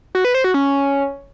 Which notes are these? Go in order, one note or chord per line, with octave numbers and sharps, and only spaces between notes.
F#4
B4
C5
F#4
C#4